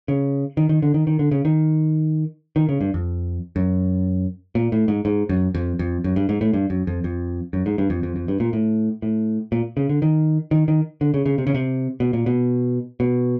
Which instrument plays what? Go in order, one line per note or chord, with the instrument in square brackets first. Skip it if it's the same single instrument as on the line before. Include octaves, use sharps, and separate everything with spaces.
[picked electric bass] C#3
D#3
D#3
D3
D#3
D#3
D3
C#3
D#3
D#3
C#3
G2
F2
F#2
A#2
A2
G#2
G#2
F#2
F2
F2
F#2
G2
G#2
A2
G2
F#2
F2
F2
F#2
G#2
G2
F2
F2
F2
G2
A#2
A2
A2
A#2
C#3
D3
D#3
D#3
D#3
D3
C#3
C#3
C3
C#3
C3
B2
A#2
B2
B2